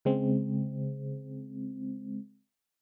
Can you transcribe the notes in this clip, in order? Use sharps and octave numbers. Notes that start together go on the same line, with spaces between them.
C#3 G#3 C4